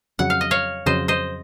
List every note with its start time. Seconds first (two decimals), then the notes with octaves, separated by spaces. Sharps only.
0.19 F2 C#3 F#3 F#5
0.30 F5
0.41 D#5
0.51 C#5 F5
0.86 F2 C#3 F#3 C5 D#5
1.08 C5 D#5